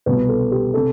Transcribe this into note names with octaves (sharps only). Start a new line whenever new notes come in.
C2 B2 B3 B4
A4
G4
C3 A4